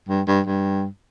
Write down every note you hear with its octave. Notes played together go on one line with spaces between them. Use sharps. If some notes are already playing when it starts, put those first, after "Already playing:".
G2
G2
G2